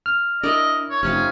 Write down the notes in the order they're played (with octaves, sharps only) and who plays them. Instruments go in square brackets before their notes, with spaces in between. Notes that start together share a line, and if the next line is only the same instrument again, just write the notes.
[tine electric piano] F6
[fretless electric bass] D4 [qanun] E4 A#4 D5 [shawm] D#5
[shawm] C#5
[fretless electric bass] F1 [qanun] C3 D#4 F4 [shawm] C#4